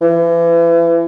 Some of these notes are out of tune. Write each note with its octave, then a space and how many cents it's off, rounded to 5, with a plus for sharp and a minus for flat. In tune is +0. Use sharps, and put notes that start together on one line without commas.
E3 +35